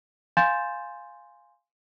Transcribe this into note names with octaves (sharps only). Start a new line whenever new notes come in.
F5 G#5 C6 G6 A6 E7